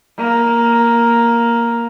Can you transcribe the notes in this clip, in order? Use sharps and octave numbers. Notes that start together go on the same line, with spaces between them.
A#3